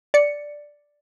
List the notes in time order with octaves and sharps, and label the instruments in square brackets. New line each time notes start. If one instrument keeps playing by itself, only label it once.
[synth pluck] D5 C#7